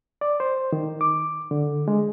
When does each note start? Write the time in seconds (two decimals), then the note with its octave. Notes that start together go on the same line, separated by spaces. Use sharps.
0.21 D5
0.40 C5
0.73 D#3
1.01 D6
1.51 D3
1.88 G#3